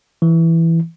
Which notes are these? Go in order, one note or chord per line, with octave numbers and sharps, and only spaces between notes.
E3